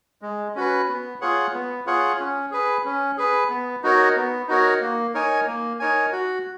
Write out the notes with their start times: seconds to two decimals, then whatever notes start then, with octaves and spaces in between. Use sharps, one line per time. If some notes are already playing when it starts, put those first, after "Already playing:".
0.22 G#3
0.55 C#4 F#4 B4
0.88 B3
1.21 F4 G#4 C#5 F#5
1.54 B3
1.86 F4 G#4 C#5 F#5
2.20 C#4
2.51 G#4 B4
2.85 C#4
3.17 G#4 B4
3.49 B3
3.83 D#4 F#4 A#4 C#5
4.16 B3
4.48 D#4 F#4 A#4 C#5
4.81 A#3
5.14 D#4 A#4 C#5 G#5
5.47 A#3
5.79 D#4 A#4 C#5 G#5
6.12 F#4